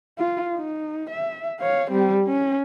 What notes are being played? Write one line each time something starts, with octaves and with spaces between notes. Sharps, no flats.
F4
D#4
E5
C#5 F5
G3 C4
C#4